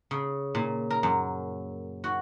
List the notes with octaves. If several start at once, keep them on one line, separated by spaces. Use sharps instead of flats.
C#3
A#2
A#4
F#2
F#4